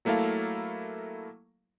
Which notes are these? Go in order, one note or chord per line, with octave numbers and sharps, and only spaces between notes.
F#3 A3 A#3 E4 A4 F5